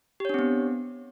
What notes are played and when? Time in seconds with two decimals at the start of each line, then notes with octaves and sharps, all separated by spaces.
0.20 G4
0.25 C#5
0.29 D4
0.34 C4
0.39 B3